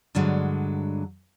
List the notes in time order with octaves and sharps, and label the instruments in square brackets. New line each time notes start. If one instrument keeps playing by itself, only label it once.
[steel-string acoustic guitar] G2 D3 F#3 G#3